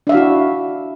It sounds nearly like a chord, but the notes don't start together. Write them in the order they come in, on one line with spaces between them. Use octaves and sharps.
D4 E5 F5 F#4 E4